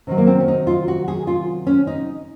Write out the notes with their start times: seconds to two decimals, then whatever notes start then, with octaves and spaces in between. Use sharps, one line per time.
0.07 C3 D#3 F#3
0.18 A#3
0.27 C4
0.40 C#4
0.48 D#4
0.67 F4
0.88 F#4
1.08 G#4
1.27 F4
1.67 C#4
1.87 D#4